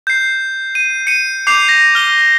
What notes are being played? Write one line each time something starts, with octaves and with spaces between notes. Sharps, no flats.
G6 C7
D#7
C#7 D#7
D6 G6 C7 F7
A#6
F6 G7